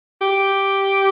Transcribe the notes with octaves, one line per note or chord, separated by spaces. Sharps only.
G4